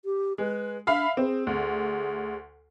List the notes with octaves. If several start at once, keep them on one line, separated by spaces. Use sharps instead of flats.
G4
G#3 B4
D4 E5 F5 B5
C4 G#4
D2 G#4